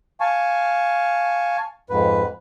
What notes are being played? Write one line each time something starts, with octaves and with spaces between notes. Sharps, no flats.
F5 G#5 A5 C#6
F2 G#2 B4